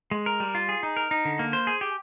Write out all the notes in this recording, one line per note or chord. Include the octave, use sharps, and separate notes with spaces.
G#3
A#4
G3
F4
G#4
D#4
A#4
D#4
D3
A#3
C5
G#4
G4